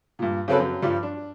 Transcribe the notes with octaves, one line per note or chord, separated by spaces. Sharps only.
G2 A#2
C#3 F#3 C4 C#4 A4 B4
F#2
G2 F3 G3
D4